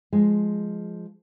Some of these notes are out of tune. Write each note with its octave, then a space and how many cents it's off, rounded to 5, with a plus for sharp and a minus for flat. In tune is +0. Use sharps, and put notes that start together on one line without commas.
F3 +0 G#3 +0